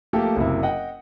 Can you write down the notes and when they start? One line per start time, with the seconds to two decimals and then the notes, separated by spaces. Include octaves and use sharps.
0.13 F3 A3 A#3 G4 A4
0.36 F#1 C3 E4
0.63 D#5 F#5 G5